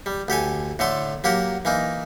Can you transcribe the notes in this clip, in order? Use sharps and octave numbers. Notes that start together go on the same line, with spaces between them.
G3
D2 G4 A4 G#5
A2 D3 A3 A4 C6
F#3 A#3 G4 F#5
E3 A#3 D#4